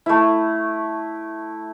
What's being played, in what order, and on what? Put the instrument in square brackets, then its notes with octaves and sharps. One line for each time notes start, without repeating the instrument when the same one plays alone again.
[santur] A3 E4